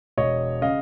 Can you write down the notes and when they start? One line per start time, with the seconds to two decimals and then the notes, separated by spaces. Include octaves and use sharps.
0.18 E1 C#5 D#5
0.62 C#3 D#5 F5